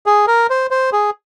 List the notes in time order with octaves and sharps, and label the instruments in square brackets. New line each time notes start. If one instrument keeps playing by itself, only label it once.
[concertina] G#4
A#4
C5
C5
G#4